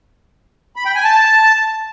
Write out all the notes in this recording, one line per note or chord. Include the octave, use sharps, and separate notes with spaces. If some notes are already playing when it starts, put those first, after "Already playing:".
B5
G5
G#5
A5